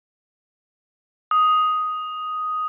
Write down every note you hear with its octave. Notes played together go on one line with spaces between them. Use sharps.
D#6